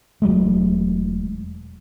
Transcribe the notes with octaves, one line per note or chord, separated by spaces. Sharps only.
E1 F#3 G#3 A3